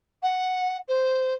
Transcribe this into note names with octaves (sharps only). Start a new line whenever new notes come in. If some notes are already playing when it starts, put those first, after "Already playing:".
F#5
C5